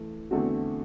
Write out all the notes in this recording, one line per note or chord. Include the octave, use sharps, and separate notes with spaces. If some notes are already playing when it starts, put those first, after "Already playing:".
Already playing: E3 A3
E2 D3 A3 C4 F#4